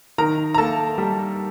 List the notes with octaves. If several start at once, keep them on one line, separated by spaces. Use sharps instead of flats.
D#3 A#4 A#5
A#5
A#3 A4 A5
G3